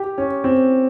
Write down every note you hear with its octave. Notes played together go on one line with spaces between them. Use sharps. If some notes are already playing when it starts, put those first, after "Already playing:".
Already playing: G4
C#4
C4